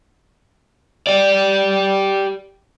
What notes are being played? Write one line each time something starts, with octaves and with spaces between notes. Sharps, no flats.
G4 D5